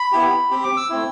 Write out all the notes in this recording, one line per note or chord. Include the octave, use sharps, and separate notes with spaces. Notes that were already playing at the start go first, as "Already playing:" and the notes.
Already playing: B5
B3 E4 G4
C4 G4
D6
E6
A3 C4 E4